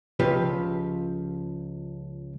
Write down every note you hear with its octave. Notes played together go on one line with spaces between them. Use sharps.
C#2 F3 G4 B4